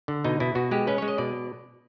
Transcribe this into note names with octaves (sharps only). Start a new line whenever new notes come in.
D3
B2 D#4
B2 E4
B2 F#4
G#3 G4
C#4 B4
G#3 C#5
D#5
B2 D5